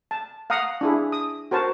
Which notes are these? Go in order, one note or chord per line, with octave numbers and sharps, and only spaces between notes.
A5
F5 F#5 A#5 D#6
D4 E4 G#4
D#6
F#4 A#4 C5 A5